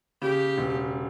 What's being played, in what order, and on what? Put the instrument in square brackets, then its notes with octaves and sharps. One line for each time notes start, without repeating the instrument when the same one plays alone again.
[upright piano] C#3 [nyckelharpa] G4
[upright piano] E1